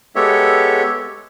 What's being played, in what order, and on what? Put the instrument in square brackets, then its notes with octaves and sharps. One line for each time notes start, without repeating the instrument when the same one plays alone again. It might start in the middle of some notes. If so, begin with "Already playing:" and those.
[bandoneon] G#3 B3 G4 A4 C#5 E5